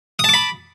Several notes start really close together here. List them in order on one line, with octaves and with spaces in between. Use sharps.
D#6 A5 D6 B5